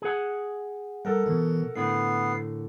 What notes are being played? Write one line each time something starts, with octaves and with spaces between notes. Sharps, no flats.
G#4 F#5
G3 A4 A#4 F#5
D2 B2 E3
A2 D3 B3 C7